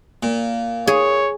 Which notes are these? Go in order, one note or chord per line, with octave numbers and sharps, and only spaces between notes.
A#2
G#4 C#5